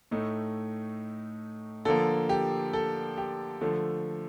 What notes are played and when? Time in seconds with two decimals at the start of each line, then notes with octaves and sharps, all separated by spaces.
0.11 A2 A3 D#4
1.85 D3 F3 A#3 A4
2.29 G4
2.73 A4
3.18 G4
3.61 D3 F3 A3